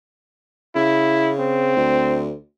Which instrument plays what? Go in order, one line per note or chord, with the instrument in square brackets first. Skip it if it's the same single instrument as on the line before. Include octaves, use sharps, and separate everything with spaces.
[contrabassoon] C#3 [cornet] E4
[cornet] C4
[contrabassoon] D2